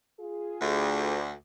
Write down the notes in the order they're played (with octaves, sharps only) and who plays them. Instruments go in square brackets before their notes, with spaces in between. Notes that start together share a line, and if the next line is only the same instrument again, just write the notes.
[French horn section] F4 G#4
[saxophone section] D2